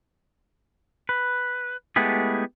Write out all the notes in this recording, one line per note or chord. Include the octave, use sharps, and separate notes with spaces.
B4
G#3 A3 B3 E4 G4 G#4